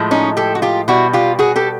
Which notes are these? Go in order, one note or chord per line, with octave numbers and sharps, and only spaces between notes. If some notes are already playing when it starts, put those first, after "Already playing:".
Already playing: A2 F3 G#3
C#4 D#4
G4 A4
F#4
F4 G4
B2 G3 E4 F#4
F4 G4
F#4 G#4
G4 A4